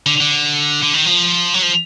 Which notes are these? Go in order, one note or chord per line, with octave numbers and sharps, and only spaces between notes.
D3
D3
D3
D#3
F3
F#3
F3